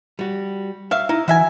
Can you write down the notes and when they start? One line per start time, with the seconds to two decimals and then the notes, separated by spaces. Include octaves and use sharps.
0.19 G3 F#4
0.91 F#3 E5 F5
1.09 D#4 E4
1.28 E3 F#4 E5 G#5